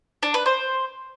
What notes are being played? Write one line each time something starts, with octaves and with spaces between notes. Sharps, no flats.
D4
B4
C5